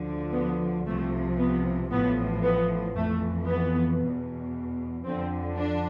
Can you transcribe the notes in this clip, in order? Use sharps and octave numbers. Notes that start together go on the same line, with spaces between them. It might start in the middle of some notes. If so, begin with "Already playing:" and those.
Already playing: D2 D3 F3
B3
C2 C3 F3 A3
B3
A1 A2 F3 B3
B3
F2 E3 A3
B3
E2 B2
F2 D3 F3 C4
D4